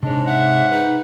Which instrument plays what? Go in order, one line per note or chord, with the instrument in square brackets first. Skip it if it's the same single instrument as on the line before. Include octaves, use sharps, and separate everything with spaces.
[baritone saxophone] G#2 [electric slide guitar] C3 C#5 [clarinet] D4 [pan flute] D#5
[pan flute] E5 [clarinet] F#5
[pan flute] D#4 [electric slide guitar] B4